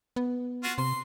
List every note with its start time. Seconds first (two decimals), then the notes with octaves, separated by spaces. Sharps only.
0.16 B3
0.63 F4 F#4
0.78 C3 C6